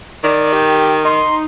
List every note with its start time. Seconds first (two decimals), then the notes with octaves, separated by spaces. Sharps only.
0.24 D#3 D5
0.53 G4
1.05 D#4 C6